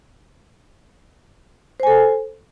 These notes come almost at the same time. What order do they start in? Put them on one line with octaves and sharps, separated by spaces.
C5 G#5 A4